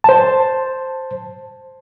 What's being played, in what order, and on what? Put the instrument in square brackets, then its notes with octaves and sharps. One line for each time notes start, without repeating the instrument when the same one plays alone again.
[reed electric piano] C5 A5